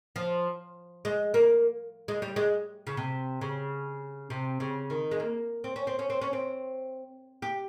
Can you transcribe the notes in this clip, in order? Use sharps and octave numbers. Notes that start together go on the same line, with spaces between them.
F3
G#3
A#3
G#3
G3
G#3
C#3
C3
C#3
C3
C#3
D#3
G#3
A#3
C4
C#4
C4
C#4
C4
C#4
C4
G4